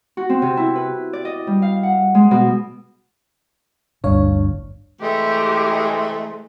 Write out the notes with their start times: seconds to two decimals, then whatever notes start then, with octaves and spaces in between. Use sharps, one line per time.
0.17 F#4
0.30 C4
0.42 C3
0.57 E4
0.76 B4
1.13 D5
1.25 D#5
1.47 G3
1.62 F5
1.83 F#5
2.15 G#3
2.31 B2
4.04 G1 D2 G2 D4 C#5 F5
5.01 C3 E3 G#3 A3 G4